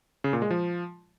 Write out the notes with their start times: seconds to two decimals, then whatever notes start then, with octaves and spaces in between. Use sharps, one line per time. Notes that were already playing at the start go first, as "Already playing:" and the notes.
0.24 C#3
0.33 A#2
0.42 G#3
0.51 F3